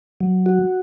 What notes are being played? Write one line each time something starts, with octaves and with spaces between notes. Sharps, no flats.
F#3
F#4